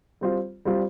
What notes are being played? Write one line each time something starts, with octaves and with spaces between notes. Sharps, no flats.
G3 C4 F4
G3 C4 F4